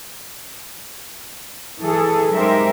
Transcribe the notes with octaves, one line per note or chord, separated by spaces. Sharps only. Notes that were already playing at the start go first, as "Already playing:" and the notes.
E3 G#4 A4
G#3 D#4 G4 A#4 C5 E5